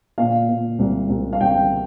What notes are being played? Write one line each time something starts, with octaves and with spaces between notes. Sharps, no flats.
A#2 F5
A#2
C2
C2
F5
C2 G5